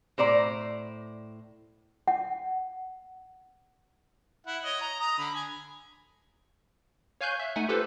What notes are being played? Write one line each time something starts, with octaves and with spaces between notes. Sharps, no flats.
A2 C5 D5 A#5
F#5
E4 F#5
C#5 D#5
A#5
A#5 D#6
D3 B5
G#5
C#5 F5 G#5 C#6 F#6 G6
E5
A3 D#4 F#5 G#5
F4 G4 A4 B4 C5